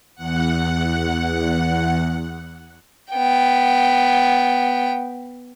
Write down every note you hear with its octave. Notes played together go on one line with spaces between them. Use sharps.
E2 F#5
B3 G5